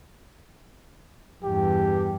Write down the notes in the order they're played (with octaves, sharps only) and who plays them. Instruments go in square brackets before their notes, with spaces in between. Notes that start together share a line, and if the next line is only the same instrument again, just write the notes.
[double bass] E2 G2 [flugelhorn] G4